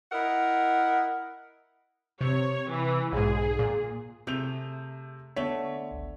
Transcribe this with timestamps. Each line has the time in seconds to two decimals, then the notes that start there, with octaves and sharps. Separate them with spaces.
0.12 E4 A#4 D#5 F#5
2.21 C3 C#5
2.70 E3
3.12 B1 G#2 G#4
3.59 A#2
4.27 C3 A3 G#4 G6 F7
5.36 D3 A3 B3 C#5 B6
5.91 G1 C#2